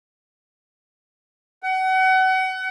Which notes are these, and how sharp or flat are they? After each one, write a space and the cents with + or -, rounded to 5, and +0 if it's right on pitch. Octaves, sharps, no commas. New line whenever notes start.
F#5 +30